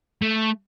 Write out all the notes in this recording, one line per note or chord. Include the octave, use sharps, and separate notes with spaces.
A3